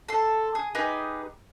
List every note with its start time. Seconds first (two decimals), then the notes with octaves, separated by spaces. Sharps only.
0.08 A4 C6
0.55 G#4
0.75 D#4 G4 G#4 B4